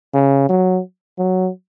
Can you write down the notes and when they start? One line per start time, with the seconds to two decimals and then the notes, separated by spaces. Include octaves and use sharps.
0.14 C#3
0.49 F#3
1.19 F#3